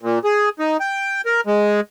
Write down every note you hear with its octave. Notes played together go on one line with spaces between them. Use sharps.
A#2
G#4
D#4
G5
A#4
G#3